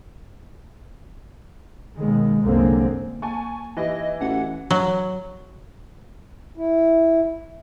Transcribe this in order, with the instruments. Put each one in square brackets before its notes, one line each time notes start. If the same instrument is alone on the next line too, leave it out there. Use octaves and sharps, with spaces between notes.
[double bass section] D#2 B2 D#3 G#3
C2 F#2 D3 G#3 A#3 C4
[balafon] A#3 [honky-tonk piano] G#5 A5 C#6
[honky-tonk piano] E3 [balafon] D#4 G4 [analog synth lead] D#5
[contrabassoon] A1 [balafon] C#4 F#4 [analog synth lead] F#5
[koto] F#3
[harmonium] E4